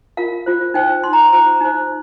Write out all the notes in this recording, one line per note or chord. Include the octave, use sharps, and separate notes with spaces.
F4 A#4 F5
F4 C5
D#4 C5 G5
D#4 C5 C6
A#5
C6
F4 C5 A#5
D#4 C5